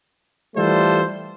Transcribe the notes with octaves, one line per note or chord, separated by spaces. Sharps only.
E3 G3 A3 F4 A4 C5